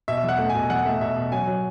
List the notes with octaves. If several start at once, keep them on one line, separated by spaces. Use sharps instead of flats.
B2 E5
E2
F#5
A3
G#5
B2
E2 F#5
A3 E5
B2 E5
B2
F#3 G#5
F#3